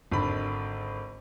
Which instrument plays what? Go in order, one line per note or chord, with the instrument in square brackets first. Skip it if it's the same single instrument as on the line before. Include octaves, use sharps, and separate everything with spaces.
[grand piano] G#1 D3 B5